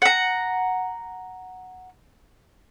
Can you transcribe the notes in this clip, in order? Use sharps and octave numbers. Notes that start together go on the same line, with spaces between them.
F#5 A#5